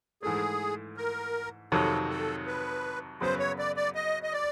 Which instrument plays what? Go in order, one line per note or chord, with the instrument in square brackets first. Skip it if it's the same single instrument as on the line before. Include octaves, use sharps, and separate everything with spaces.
[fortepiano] G#2 E3 A3 [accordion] G#4
[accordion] A#4
[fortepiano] F2 C3 D#3 F#3 [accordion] A4
[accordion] A4
B4
[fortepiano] F#2 C#3 F#3 B3 [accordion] C5
[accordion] C#5
D5
D5
D#5
D#5
D5